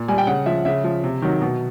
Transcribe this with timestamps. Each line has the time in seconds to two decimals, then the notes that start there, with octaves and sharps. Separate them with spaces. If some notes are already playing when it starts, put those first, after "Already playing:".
Already playing: A#2
0.08 G3 G#5
0.18 G5
0.27 C#3 F#5
0.46 F3 E5
0.65 C#3 E5
0.84 F3
1.04 C3
1.22 D#3 F#3
1.41 B2